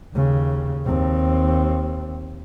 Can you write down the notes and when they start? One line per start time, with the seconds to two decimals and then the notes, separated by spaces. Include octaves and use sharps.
0.14 D#2 C#3
0.85 D#2 C4